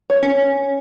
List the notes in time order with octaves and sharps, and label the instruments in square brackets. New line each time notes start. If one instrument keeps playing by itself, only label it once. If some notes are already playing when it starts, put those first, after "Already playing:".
[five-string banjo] C#5
[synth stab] C#4